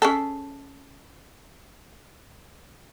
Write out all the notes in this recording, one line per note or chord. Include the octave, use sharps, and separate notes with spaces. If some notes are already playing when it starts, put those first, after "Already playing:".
C#4 G#4 A4